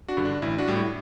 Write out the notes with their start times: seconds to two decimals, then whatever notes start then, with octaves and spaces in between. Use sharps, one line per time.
0.08 D4 F#4
0.17 G2 D3
0.25 D4
0.42 A1 E4
0.58 D4 F#4
0.67 A2 G3
0.76 E4